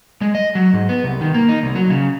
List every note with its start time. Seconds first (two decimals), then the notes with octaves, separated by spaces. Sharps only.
0.21 G#3
0.35 D#5
0.55 F#3
0.73 G#2
0.89 B3
1.04 C2
1.21 D#3
1.34 A#3
1.49 D#4
1.63 C2
1.75 F#3
1.90 C#3